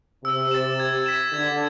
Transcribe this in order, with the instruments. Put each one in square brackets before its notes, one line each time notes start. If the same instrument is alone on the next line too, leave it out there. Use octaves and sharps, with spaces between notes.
[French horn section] C3 [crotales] E6
[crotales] A6 E7
G#6
B6 E7
[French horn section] D3 [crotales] G#6